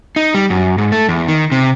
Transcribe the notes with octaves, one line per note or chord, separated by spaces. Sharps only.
D#4
G3
F#2
G#2
A3
E2
D#3
C3